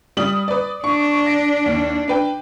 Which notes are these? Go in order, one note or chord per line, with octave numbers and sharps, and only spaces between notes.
G3 D#6 F#7
B4 D5
D4 C#6
A#6
D#2
D4 B4 G5